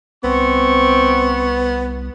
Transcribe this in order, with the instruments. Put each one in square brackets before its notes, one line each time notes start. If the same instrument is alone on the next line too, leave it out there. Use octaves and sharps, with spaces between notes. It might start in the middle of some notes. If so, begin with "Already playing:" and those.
[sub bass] C2 [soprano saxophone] B3 [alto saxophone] C4 [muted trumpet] C#6